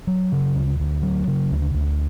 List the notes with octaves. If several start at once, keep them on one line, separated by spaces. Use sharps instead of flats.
F#3
C#3
D2
D2
F#3
C#3
D2
D2